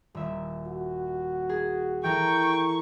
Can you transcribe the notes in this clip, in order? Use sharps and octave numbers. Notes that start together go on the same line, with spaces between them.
D#1 E5
F#4
G#4
E3 A4 A#4 G5 C#6